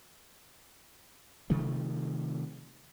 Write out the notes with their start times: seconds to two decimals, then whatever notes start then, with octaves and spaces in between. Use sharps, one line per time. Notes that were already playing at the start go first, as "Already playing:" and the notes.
1.50 C3 D#3 F3 A3